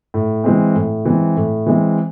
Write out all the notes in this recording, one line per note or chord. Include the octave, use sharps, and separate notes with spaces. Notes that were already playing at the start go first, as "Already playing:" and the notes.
A2
E3 G#3 C4
A2
E3 G#3 C4
A2
E3 G#3 C4